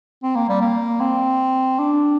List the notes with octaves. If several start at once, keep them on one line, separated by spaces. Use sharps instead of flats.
C4
A#3
G3
A#3
C4
D4